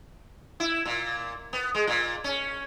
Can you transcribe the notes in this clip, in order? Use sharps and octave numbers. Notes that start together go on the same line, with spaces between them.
E4
A#2
B3
G#3
A#2
C#4